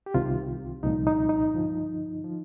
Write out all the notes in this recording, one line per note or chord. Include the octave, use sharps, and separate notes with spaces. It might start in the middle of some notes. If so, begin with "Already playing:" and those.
G4
C2 C3 D#3 F4
C2 A#2 F3 D#4
D#4
D#4
G2 D3 F3
F3